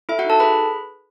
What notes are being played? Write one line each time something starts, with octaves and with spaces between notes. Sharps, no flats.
E4 A4 E5
F#4 F#5
D#4
A4 A5
G#4 B4 B5